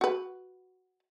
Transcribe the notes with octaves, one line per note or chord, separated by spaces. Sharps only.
F#4 B4